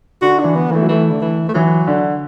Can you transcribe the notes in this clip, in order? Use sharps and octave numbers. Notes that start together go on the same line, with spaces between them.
D3 F#4
E3 D4
B3
E3 A3
F#3
E3 A3
D3
E3
A3
E3 F#3
D3